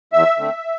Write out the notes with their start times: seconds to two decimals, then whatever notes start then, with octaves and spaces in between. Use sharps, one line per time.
0.13 E2 E5
0.38 D3 A3 C4